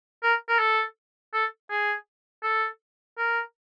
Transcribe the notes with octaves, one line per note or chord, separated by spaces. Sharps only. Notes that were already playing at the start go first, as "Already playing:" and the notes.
A#4
A#4
A4
A4
G#4
A4
A#4